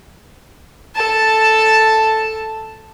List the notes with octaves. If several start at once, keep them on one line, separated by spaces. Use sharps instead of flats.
A4 A5